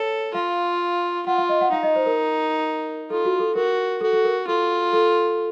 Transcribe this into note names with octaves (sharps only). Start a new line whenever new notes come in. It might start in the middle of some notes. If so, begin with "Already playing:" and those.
Already playing: A4 C#5
F4 F5
F4 F#5
F5
D#5
F#5
D#4 F5
D#5
C5
A#4
F4 A4
F#4
A4
F#4 A#4
F#4 A4
A4
A#4
F4 A4
A4